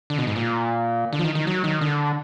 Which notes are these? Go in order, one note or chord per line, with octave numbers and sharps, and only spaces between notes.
D3
B2
G#2
A#2
D3
F3
D#3
D#3
F#3
D#3
D3